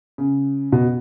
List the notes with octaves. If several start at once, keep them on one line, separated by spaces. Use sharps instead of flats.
C#3
B2